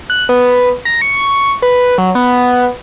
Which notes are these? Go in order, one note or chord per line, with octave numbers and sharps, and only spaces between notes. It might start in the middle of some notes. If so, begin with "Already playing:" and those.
F#6
B3
A#5
C#6
B4
F#3
B3